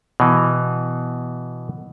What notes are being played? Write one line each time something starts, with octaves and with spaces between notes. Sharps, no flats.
B2 E3